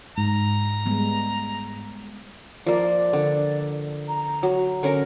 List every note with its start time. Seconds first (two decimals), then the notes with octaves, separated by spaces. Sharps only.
0.17 G#2 A#5
0.86 G3 G#3 B3
2.67 F3 A#3 D5
3.13 D3
4.09 A#5
4.43 F#3
4.83 D3 C#4 A#4